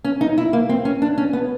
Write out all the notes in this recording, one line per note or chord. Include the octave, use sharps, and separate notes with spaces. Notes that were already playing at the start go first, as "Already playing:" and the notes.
C#4
D#4
E4
A#3
C4
C#4
D4
C#4
B3